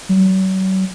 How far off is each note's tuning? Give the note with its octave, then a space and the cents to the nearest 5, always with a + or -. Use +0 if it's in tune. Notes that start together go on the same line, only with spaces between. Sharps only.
F#3 +40